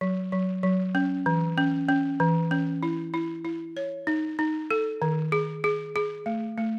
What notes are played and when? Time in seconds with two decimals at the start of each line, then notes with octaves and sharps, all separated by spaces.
0.01 F#3
0.32 F#3
0.63 F#3
0.95 C#4
1.26 E3
1.58 C#4
1.89 C#4
2.20 E3
2.51 C#4
2.83 E4
3.14 E4
3.45 E4
3.77 C#5
4.07 D#4
4.39 D#4
4.70 A4
5.02 D#3
5.32 G#4
5.64 G#4
5.96 G#4
6.26 A3
6.58 A3